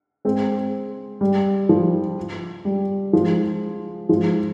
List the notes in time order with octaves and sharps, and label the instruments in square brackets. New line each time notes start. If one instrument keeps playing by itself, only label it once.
[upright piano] G#3 C4
G3
F3
G3
F3 G#3
F3 G#3